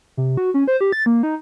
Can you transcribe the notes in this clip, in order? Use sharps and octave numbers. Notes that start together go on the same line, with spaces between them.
C3
F#4
C#4
C5
G4
A6
A#3
D#4